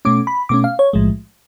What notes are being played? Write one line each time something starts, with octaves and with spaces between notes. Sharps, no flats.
B2 A3 C#4 D6
B5
B2 A3 C#4 D6
F5
C#5
B1 A2 F3 G#3